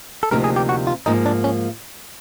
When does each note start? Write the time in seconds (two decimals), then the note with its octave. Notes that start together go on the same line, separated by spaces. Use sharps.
0.23 A4
0.31 D2 C3 F3 A#3 D#4 A#4
0.44 G#4
0.56 G4
0.69 F#4
0.87 F4
1.06 G#2 F3 A#3 D#4
1.26 D4
1.44 C#4